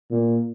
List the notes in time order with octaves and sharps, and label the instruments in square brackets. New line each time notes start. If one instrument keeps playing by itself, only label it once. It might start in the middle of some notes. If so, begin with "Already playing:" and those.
[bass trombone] A#2